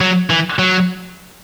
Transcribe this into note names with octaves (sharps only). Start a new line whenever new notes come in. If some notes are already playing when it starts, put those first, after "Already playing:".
F#3
E3
F#3